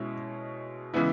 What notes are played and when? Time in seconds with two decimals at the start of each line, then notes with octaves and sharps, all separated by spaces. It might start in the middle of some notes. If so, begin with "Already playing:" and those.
Already playing: B2 G#3 C#4 E4
0.94 C#3 E3 G#3 B3 E4